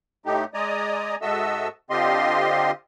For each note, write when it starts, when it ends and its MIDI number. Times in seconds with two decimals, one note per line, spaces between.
0.26 0.44 45
0.26 0.44 57
0.26 0.44 63
0.26 0.44 67
0.54 1.15 56
0.54 1.15 74
0.54 1.15 75
0.54 1.15 80
0.54 1.15 82
0.54 1.15 87
1.22 1.68 44
1.22 1.68 66
1.22 1.68 69
1.22 1.68 75
1.22 1.68 76
1.22 1.68 88
1.90 2.71 50
1.90 2.71 60
1.90 2.71 65
1.90 2.71 67
1.90 2.71 75
1.90 2.71 84